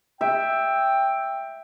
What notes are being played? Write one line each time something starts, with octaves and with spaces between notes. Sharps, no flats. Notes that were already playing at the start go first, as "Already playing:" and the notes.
E5 G5